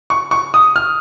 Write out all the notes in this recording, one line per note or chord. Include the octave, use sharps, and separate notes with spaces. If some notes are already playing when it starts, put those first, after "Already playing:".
C#6
C#6
D#6
F6